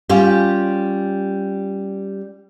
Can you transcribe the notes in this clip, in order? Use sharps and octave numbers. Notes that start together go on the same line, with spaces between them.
G3 C#4 F4 G4